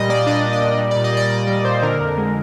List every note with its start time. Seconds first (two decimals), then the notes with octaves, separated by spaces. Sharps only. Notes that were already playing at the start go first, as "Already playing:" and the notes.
Already playing: A#2 G3 D#5
0.09 A#3 D5
0.27 D4 D#5
0.44 G3
0.53 D#5
0.61 A#2
0.78 G3
0.91 D5
0.96 A#2
1.04 D#5
1.13 A#3 D5
1.30 A#2 D5
1.47 G3 D5
1.65 A#2 C5
1.83 D3 A#4
1.99 F2
2.18 G#3